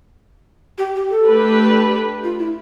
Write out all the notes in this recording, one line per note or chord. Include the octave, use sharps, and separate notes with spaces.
G4
G4
A4
A3 D4 G4 B4
F4
E4